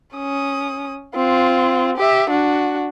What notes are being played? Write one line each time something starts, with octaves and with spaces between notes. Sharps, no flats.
C#4 D#6
C4 F4
G4 E5
D4 F#4